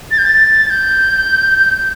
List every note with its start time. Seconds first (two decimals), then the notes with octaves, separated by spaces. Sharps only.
0.11 A6
0.18 G6
0.25 A6
0.70 G6